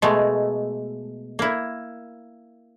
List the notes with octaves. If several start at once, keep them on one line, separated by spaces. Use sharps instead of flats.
B2 G#3 A3
A#3 E4